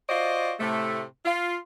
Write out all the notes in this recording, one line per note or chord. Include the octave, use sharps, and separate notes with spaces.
F4 F#4 C5 D5 D#5
A2 C3 A3
F4